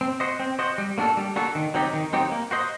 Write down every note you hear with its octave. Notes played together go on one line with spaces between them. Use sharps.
C4
F#4 C5 D#5
C4
F#4 C5 D#5
G3
A#3 D4 F#4 A4
G3
A#3 D4 F#4 A4
D#3
F#3 C4 D#4 G4
D#3
F#3 C4 D#4 G4
A#3
F#4 C5 D#5